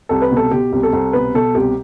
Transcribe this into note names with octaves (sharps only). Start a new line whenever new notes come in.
C2 A4
B4
B2
A4
B2 G4
C2
A4
C2
B2 B4
B2 A4
C2 G4